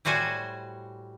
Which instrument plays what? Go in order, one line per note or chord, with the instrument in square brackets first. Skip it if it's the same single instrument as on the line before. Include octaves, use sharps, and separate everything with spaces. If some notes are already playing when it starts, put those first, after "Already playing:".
[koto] A2 G3 F#4 C5 G#5